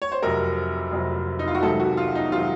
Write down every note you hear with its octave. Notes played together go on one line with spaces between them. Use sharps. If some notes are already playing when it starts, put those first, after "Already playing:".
C#5
C5
F1 F2 C3 F#3 A#4
F1 F2 C3 F#3
D#4
F4
F#4
C#2 C3 D#3 F#3 A4
F#4
F4
D#4
C3 D#3 F#3 F4